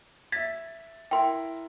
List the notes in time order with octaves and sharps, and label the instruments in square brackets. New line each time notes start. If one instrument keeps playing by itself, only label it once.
[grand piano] E5 A6 [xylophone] G#6 B6
[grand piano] E4 A#4 [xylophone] G5 C6